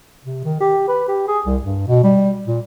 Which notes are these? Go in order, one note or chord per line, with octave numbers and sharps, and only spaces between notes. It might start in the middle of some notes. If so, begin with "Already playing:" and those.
C3
D#3
G4
B4
G4
G#4
C2
G2
B2
G3
A#2